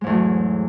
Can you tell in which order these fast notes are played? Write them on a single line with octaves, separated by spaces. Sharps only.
G#3 G#2 E2 A3 F#3